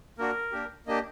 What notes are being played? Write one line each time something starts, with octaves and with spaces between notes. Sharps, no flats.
A#3 D4 F#4 A#4
A#3 D4 G4
A#3 D4 G4 D#5